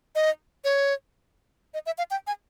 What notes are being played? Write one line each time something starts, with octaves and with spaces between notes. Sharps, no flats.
D#5
C#5
D#5
E5
F5
G5
G#5